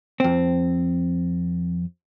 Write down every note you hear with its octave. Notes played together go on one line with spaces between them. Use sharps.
F2 C4